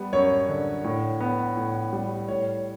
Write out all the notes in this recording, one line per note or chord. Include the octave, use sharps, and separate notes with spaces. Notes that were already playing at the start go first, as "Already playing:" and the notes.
Already playing: G3 B3
F#2 C#5
D3
A2
B3
A2
G3
A2 C#5